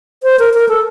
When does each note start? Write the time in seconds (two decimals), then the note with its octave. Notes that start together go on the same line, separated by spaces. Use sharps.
0.23 C5
0.39 A#4
0.54 A#4
0.69 A4